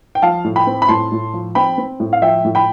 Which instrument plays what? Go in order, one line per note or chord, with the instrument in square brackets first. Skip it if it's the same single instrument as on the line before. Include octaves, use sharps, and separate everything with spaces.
[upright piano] G5
F3 F5 A5
A2
G5 B5
C4
B5
A2 A5 C6
A2
F3
C4 G5 B5
C4
A2
F5
F3 E5 G5
A2
G5 B5